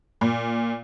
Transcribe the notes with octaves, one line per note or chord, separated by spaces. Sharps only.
A#2